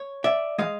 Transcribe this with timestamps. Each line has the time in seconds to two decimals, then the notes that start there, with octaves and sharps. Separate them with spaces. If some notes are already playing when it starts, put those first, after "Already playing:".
Already playing: C#5
0.24 D5 E5
0.58 E3 G#3 D#5 F5